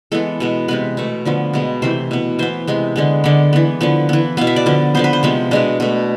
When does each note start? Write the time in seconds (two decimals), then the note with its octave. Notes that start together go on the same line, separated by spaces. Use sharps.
0.12 E3 G#3 B3 A4
0.40 B2 G#3 B3
0.68 C3 G#3 B3 B4
0.97 B2 A3
1.25 D3 F3 B3
1.54 B2 G#3 B3
1.82 C3 E3 A3 C5
2.11 B2 B3
2.39 E3 B3 C5
2.67 C3 G#3 B3
2.96 D3 G#3 B3
3.24 D3 G#3 B3 D5
3.53 E3 B3
3.81 D3 F3 B3
4.09 E3 B3
4.37 B2 B3 F5
4.47 E5
4.56 D5
4.66 D3 F3 B3
4.95 D3 F3 B3 C5
5.04 B4
5.13 C5
5.23 C3 F3 G#3 B3
5.51 B2 G#3 B3 D4
5.80 B2 A3